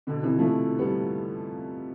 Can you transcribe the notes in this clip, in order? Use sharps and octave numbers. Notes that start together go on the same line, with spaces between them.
B2 D3
C3 E3
F3 A3
G3 B3